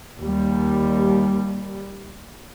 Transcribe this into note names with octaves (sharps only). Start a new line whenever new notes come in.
D#2 G3